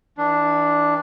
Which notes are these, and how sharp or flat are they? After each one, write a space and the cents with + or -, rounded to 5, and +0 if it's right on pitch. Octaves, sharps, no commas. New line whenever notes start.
E3 -35 D4 +0